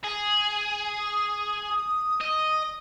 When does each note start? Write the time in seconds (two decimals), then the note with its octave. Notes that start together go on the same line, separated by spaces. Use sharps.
0.04 G#4 G#5
1.12 D#6
2.21 D#5